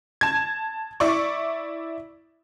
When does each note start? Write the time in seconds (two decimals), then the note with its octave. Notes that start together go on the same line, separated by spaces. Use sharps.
0.21 A5 G#6
1.00 E4 D5 C#6